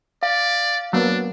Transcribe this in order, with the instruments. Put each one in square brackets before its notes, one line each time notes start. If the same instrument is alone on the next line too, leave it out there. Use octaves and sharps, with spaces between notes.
[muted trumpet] D5 [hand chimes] F5
[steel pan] F#3 A#3 B3 [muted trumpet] D4